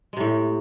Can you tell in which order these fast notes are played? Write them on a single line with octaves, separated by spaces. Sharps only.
G#3 C3 A2